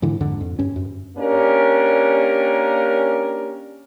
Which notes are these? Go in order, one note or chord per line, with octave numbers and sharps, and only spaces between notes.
G#2 D3 E3
F2 G#2 D3
F2
G2 C#4
F#2
A#3 C#4 D4 G4 A#4